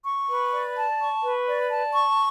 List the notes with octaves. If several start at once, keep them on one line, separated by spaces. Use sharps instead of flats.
C#6
B4
D5
A5
C#6
B4
D5
A5
C#6